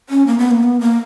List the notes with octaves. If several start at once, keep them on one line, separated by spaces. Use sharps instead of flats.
C#4
A#3
B3
A#3
B3
A#3